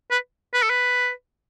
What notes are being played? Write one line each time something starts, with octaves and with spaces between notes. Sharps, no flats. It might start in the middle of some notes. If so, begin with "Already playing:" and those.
B4
B4
A4
B4